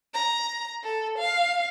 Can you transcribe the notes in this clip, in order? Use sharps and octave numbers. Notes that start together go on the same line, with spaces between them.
A#5
A4
F5